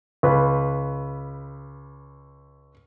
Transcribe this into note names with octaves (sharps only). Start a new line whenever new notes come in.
C#2 B4